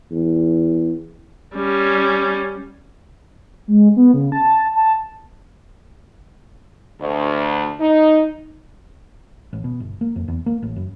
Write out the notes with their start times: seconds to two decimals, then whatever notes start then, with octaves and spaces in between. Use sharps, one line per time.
0.11 E2
1.55 G3 C#4
3.68 G#3
3.96 B3
4.14 C#3
4.32 A5
4.76 A5
7.01 D2
7.80 D#4
9.53 A1
9.64 B2
9.80 G1
10.01 A#3
10.16 F2
10.28 E2
10.46 A#3
10.62 A1
10.76 F#2